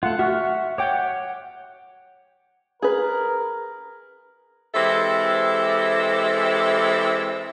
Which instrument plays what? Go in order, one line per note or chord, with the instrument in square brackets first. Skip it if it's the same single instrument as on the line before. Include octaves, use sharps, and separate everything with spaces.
[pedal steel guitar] A3 F4 [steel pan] F#5
[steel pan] F#4 [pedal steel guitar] E5 F#5 F6
[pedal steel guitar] C#5 F#5 [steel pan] G5 D6
[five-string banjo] G#4 B4 [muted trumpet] A#4
[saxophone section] E3 G#3 C4 G4 A4 E5